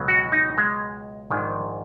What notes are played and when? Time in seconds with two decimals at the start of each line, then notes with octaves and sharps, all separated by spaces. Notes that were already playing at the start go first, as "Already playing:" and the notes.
Already playing: C#2 B2 F#3
0.08 F#4
0.32 D#4
0.58 G#3
1.31 A#1 G#2 D#3